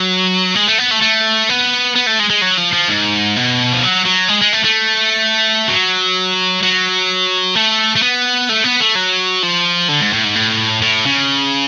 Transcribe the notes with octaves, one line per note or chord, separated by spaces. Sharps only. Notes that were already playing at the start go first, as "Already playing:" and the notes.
Already playing: F#3
G#3
A3
B3
A3
A3
B3
B3
A3
G#3
G#3
F#3
F3
F3
G#2
B2
F3
F#3
F#3
G#3
G#3
A3
A3
F#3
F#3
A3
A3
B3
A3
B3
A3
F#3
F3
D3
G#2
A2
G#2
A2
A2
C#3